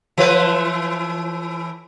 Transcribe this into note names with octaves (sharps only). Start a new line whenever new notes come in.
E3 A3 B4